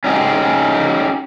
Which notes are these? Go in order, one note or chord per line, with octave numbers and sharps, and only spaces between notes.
C#4 D#4 G4 G#4